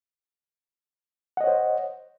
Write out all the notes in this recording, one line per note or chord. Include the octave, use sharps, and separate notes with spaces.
C5 C#5 D#5 F#5